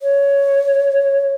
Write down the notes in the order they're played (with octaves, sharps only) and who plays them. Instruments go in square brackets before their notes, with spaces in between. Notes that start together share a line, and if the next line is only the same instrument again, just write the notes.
[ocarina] C#5